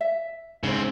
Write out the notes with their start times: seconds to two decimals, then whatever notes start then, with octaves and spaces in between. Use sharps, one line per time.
0.01 E5
0.64 G#2 C#3 C4